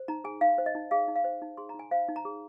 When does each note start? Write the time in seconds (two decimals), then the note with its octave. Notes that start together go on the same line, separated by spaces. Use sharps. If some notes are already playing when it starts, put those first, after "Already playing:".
Already playing: C5
0.08 D#4 A#5
0.24 G#4 G#5
0.41 D#4 F5
0.58 C5
0.66 D#5
0.75 D#4
0.91 G#4 F5
1.08 D#4
1.16 F5
1.24 C5
1.42 D#4
1.57 G#4 C6
1.69 A#5
1.74 D#4 G#5
1.91 C5 F5
2.08 D#4
2.16 A#5
2.25 G#4